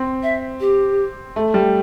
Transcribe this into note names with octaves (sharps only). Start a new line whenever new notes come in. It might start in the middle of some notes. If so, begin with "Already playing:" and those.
Already playing: C4
E5
G4
A3
G3